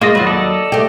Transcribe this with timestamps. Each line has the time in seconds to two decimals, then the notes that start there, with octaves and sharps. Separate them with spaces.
0.01 G#3 A#3 F4 D#5
0.15 D#2 F#3 F4 F#4 B4
0.27 A4 D5 D#5
0.72 A3 C4 G4